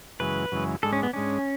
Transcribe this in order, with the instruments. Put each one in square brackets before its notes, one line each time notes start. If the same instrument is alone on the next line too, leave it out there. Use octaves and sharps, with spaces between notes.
[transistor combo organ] F#2 C#3 E3 G#3 [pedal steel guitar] B4
[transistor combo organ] F#2 C#3 E3 G#3
[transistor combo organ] G#2 G#3 D4 [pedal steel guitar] A4
[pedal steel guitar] C#4
B3
[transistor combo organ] G#2 G#3 D4 [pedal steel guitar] C#4